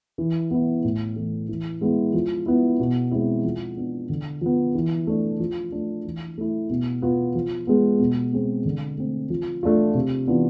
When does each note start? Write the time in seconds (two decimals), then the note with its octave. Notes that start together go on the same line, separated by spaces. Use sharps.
0.18 E3
0.51 B3 E4
0.84 A2
1.16 E3 A3
1.48 E3
1.81 G#3 B3 E4
2.14 F3
2.46 B3 E4
2.80 B2
3.11 G#3 C4 E4
3.45 F3
3.76 B3 D4
4.09 D3
4.41 F3 B3
4.75 E3
5.07 A3 D4
5.40 F3
5.72 A3 D4
6.04 E3
6.38 A3 E4
6.70 B2
7.02 B3 F4
7.35 F3
7.67 G#3 B3
7.99 B2
8.33 G#3 C4
8.65 D3
8.98 A3 C4
9.30 F3
9.63 A3 D4 F4
9.95 C3
10.27 E3 B3 D4 F4